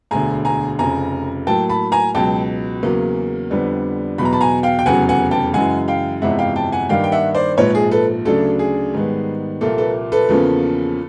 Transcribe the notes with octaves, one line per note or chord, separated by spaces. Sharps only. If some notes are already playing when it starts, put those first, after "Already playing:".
E1 D2 D3 G#5 A#5
G#5 A#5
F1 F2 C#3 G#5 A#5
A2 F#3 A#3 G5 A5
A5 B5
G#5 A#5
C#2 B2 F#3 G5 A5
E2 C#3 F#3 A#3 C#4
F2 D3 G3 B3 D4
E2 B2 F#3 B5
A#5
A5 B5
G#5 A#5
F5 G5
G5
F1 E2 C#3 F#3 F#5 G#5
F#5 G#5
G5 A5
F#2 C#3 E3 G#3 F#5 G#5
F5 G5
G1 F2 C3 E3 G#3 E5 F#5
F5 G5
G5 A5
F#5 G#5
G2 D#3 G3 A#3 D4 F5 G5
G5
E5 F#5
C5 D5
A#1 G#2 F3 B4 C#5
G#4
A4 B4
D2 C#3 F#3 A3 D4 A4
G#4
G#2 D#3 G3 B3
C2 A#2 F3 A#3 A4
A4 B4
A4 B4
E2 C#3 F3 A#3 C#4